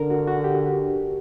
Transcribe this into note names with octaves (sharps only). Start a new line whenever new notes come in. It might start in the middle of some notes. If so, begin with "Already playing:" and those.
Already playing: D3 A#4
F#4
F#4
G4